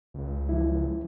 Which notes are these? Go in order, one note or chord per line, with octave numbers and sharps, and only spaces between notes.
C#2
F3 E4